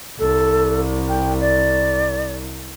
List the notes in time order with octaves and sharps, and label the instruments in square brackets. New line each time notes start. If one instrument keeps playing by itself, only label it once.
[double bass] C2 [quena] A4
[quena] G5
D5